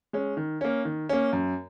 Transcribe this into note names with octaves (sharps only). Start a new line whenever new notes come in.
G#3 C#4
D#3
A#3 C#4
D#3
A#3 C#4
F#2